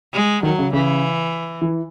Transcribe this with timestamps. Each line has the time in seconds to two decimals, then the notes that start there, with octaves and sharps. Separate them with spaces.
0.13 G#3
0.43 D#3 F#3
0.59 C#3
0.73 C#3 E3
1.62 E3